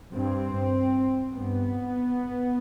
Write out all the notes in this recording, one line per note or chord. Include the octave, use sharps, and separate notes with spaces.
G2 C4
G2 B3